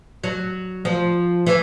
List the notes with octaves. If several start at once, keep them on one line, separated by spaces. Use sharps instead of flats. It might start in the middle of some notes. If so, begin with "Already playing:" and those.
F#3
F3
E3